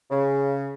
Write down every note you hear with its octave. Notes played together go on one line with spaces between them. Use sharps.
C#3